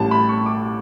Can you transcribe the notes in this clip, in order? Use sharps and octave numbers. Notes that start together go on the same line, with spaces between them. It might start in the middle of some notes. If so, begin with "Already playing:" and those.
Already playing: A1 A2 G3 A5
B5
C#6
D6